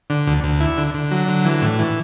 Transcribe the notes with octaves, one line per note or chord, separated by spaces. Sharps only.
D3
D2
D2
E4
D3
D3
F#3
D3
E3
A2
E3